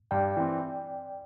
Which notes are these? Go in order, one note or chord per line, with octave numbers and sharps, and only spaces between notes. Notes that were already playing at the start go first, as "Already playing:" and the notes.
G2 D5 G5
E3 C4